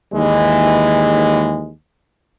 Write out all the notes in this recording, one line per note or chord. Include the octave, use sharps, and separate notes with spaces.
D#2 E3 G#3